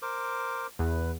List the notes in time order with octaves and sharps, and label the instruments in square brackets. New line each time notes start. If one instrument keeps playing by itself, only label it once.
[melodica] A#4 C5 D6
[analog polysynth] E2 [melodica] B4